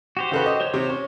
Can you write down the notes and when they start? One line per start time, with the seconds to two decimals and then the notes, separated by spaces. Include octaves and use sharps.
0.17 F#4 G4 C5
0.32 C#3 A4 B4
0.46 D#5
0.61 C5 C#5 G6
0.74 C3
0.89 C#4